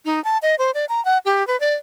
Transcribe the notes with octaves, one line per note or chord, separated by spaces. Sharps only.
D#4
A5
D#5
C5
D5
A#5
F#5
G4
B4
D5